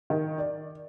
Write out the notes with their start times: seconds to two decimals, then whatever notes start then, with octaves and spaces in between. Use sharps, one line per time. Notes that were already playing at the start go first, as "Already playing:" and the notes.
0.10 D#3
0.38 D5